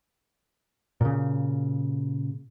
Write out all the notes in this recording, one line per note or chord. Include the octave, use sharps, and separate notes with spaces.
A#2 C#3